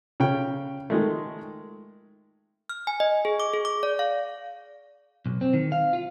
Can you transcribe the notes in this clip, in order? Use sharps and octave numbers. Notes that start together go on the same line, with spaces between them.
C#3 G5
D#3 G#3 A3
F6
G#5
D#5
G#4
D6
G#4
D6
D5
F5
B1
C4
D#3
F5
F4